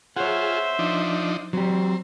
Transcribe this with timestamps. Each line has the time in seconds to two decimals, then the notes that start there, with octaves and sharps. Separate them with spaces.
0.17 F4 G#4 C5 C#5 E5 F#5
0.79 F3 D4 D#4
1.53 F#3 C4 G4